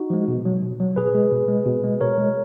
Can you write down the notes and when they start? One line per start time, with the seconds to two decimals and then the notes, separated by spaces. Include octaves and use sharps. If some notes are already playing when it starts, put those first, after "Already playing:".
Already playing: D#4 F#4
0.10 F3 G#3
0.28 B2
0.45 F#3
0.62 B2
0.80 F#3
0.96 B2 G#4 B4
1.14 G#3
1.31 B2
1.48 G#3
1.66 B2
1.84 G#3
2.01 B2 A#4 C#5
2.18 G#3